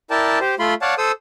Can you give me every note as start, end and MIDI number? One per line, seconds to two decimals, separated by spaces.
0.10 0.39 64
0.10 0.39 70
0.10 0.39 74
0.10 0.39 79
0.10 0.39 81
0.40 0.55 67
0.40 0.55 72
0.59 0.74 57
0.59 0.74 65
0.59 0.74 83
0.59 0.74 84
0.82 0.94 73
0.82 0.94 74
0.82 0.94 77
0.82 0.94 78
0.82 0.94 81
0.98 1.12 69
0.98 1.12 72
0.98 1.12 87
0.98 1.12 88